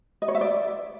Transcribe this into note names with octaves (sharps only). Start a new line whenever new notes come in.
D#5
C#5
E5
D5